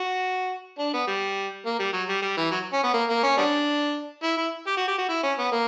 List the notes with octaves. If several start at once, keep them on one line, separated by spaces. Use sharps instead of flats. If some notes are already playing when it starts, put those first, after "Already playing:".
Already playing: F#4
D4
B3
G3
A#3
G3
F#3
G3
G3
E3
F#3
C#4
B3
A#3
A#3
C#4
G3 B3 D4
E4
E4
G4
F#4
G4
F#4
E4
C#4
B3
A#3